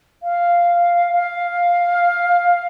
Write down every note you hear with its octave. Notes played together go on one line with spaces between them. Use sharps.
F5
F5